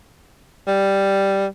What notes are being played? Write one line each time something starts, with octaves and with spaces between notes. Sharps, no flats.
G3